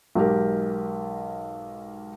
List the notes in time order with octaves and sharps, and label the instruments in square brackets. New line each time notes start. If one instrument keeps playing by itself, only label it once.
[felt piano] B1 G#2 G4 A#4